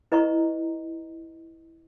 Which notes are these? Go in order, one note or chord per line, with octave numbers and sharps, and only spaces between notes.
E4 B4 D#5 A#5 C#6